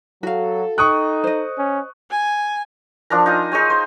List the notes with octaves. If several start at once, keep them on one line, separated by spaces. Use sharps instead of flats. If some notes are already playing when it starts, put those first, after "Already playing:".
F#3 F#4 A4 F5
D#4 G5 C#6 D#6 F#6
C5 D#5
C#4
G#5
F3 D4 A#4 A#5
D#4 F4 G#5
D#4 G#4 C#5 G#5
C5